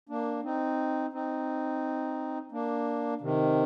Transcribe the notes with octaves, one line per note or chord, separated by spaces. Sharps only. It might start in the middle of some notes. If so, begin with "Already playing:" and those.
A#3 D4
C4 D#4
C4 D#4
A#3 D4
C3 D#3